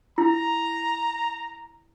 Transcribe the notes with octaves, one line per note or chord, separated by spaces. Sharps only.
E4 A#5